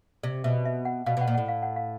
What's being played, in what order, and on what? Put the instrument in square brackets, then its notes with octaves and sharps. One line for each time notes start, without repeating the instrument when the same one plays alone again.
[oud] C3 [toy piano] D5
[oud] B2 [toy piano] E5
[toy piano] E5
F#5
[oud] B2 [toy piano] F5
[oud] B2 [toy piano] F#5
[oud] A#2
[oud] A2 [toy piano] F#5
[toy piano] F5
F#5
F5